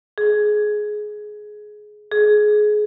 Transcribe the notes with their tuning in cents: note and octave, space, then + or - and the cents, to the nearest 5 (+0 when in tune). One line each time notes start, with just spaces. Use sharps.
G#4 +15
G#4 +20